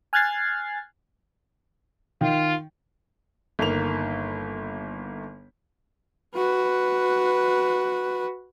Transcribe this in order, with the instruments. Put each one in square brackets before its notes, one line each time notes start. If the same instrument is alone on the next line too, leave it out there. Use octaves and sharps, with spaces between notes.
[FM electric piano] G#5 F6 F#6 G#6 A6 C7
[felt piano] D#3 [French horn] F4
[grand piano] G1 D#3 A#3 F7
[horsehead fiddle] F#4 B4